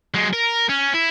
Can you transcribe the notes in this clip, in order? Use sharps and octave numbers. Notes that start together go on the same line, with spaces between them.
F#3 G#3
A#4
C#4
E4